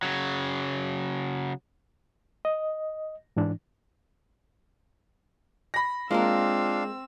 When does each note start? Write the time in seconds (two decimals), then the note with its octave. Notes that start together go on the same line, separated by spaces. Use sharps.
0.03 C#3 F#3
2.45 D#5
3.36 G#2 E3 D4
5.74 B5 A#6
6.11 G#3 A#3 C4 D4 F4 A#4 F5 E6